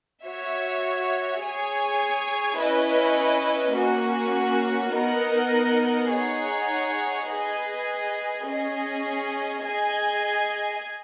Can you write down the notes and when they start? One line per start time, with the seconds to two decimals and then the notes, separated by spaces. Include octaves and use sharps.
0.24 F#4 C#5 E5
1.41 G#4 C#5 G#5
2.59 C#4 E4 B4 D#5
3.76 A#3 C#4 F#4
4.93 B3 D#4 A#4 D#5 F#5
6.10 D#4 G#4 C#5 F#5
7.28 G#4 B4 D#5
8.45 C#4 G#4 D#5
9.63 G#4 D#5 G#5